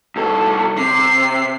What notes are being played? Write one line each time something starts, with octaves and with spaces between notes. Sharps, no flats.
C2 A4
C3 C7